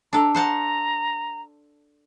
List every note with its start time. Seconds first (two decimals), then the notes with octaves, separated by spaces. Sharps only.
0.13 D4 A4 A#5
0.34 C5 F#5 A5 A#5